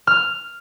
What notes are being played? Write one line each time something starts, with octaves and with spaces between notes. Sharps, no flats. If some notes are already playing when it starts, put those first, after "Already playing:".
F6